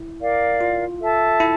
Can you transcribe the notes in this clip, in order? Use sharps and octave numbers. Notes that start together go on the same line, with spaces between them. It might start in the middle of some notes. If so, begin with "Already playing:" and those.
Already playing: E4
A#4 D5 F5
F4
A4 E5 A5
E4